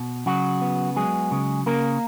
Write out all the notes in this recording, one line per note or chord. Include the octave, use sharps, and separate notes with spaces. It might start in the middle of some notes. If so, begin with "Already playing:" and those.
Already playing: B2
C#3 F#3 F#4
B3
F#3 G#3 G#4
C#3
C#3 A#3 A#4